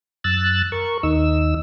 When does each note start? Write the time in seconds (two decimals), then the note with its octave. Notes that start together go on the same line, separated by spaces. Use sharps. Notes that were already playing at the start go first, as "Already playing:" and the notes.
0.24 F#2 E6 F#6 A6
0.72 A#4 C#6
1.03 D#2 D#4 E6